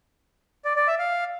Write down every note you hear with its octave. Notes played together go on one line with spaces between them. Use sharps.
D5
D5
E5
F5